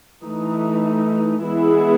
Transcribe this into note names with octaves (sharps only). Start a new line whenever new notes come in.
E3 A3 D#4
E3 G#3 B3 E4 G#4